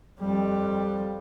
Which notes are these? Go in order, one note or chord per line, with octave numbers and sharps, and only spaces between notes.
F2 G3